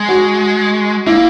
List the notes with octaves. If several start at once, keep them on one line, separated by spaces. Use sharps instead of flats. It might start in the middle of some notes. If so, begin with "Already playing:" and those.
Already playing: G#3
F#4
A#3 E4